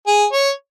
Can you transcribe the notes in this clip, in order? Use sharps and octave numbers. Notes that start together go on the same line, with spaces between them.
G#4
C#5